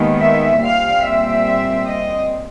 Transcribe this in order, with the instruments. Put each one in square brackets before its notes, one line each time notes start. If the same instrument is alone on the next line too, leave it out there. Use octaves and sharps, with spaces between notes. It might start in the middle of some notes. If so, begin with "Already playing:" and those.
Already playing: [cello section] D#2 D#3 G#3 B3
E5
A#2 G3 C4 F5
E5
E5
D#5